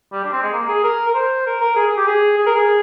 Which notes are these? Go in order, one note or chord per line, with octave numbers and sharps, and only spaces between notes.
G3
D4
C4
G#3
A#3
G#4
A#4
A#4
C5
A#4
A#4
G#4
G#4
G4
G#4
G#4
A#4
G#4